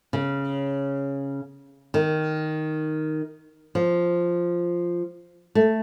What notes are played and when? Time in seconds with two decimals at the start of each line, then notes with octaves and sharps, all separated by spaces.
0.13 C#3
1.94 D#3
3.75 F3
5.55 A3